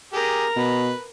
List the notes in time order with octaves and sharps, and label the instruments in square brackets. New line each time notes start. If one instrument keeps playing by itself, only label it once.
[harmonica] G4 G#4 [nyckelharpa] A#4 A#5
[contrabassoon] B2 [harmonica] B4